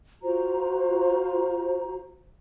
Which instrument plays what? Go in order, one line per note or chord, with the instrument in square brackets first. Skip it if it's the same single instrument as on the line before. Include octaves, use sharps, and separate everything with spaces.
[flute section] F4 F#4 C5 A#5